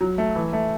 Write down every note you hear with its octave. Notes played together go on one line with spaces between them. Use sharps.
F#3
A3
E3
A3